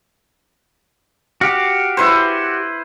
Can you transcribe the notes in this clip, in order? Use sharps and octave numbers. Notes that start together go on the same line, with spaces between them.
F#4 G4 F5
E4 B4 C5